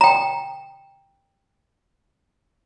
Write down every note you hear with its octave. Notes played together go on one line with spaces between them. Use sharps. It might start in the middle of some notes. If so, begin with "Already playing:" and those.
G5 A#5